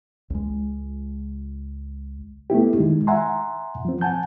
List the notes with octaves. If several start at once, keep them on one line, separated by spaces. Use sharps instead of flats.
C#2 G#3
A3 B3 E4 G4
D#3 G#3 D#4
E5 F#5 G#5 A#5 C6
F3 C4
F#5 G#5 A5 G6